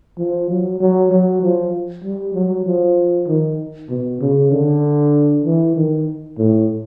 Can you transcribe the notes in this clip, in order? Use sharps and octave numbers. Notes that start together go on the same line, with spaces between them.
F3
F#3
F#3
F#3
F3
G3
F#3
F3
D#3
B2
C#3
D3
E3
D#3
A2